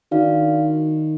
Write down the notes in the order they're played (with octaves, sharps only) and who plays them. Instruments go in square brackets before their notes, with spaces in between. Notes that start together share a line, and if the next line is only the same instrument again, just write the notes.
[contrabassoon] D#3 [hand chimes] D4 F#4 D5 F5